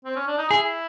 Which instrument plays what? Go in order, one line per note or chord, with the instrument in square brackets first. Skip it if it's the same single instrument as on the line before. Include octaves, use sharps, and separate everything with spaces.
[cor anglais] C4
C#4
D4
D#4
[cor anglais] E4 [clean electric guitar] G#4